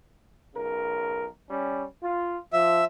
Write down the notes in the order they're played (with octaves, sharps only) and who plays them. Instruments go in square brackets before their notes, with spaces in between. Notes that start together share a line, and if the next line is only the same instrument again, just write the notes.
[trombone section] B1 C#3 A#4
G3 C#4
F4
[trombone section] F3 [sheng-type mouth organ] E5